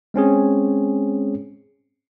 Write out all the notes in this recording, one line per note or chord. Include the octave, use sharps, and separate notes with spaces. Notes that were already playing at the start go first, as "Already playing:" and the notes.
G#3 C4 C#4 G#4